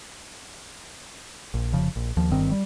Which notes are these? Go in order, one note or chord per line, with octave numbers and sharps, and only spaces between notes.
A#1
F1 C#3 F3
A#1
D#2 F3
G1 G2 D#3 C4
G3